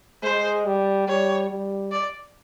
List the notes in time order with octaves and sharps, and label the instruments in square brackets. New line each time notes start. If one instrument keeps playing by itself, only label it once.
[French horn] G#3 [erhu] C5
[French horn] G3
[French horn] G3 [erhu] C#5
[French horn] G3
[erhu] D5